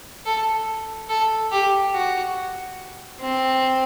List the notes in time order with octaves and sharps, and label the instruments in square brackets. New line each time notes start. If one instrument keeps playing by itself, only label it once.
[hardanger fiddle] A4
A4
G4
F#4
C4